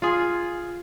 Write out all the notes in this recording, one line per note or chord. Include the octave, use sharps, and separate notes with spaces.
F4 G#4